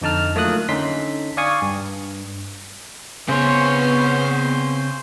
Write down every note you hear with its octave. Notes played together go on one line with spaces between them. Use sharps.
F2 D3 D#4 A5 F6
F#3 A3 A#3 F4 D#6 F#6
D3 C#4 D#4 A4 C6 B6
D5 F5 G#5 C#6 D#6
G2
C#3 B3 C4 C5 C#5